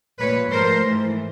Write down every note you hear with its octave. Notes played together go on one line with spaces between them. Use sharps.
A#2 F3 A#3 B4 C#5
G#2 F3 A3 A#4 C5
G#2 E3 A3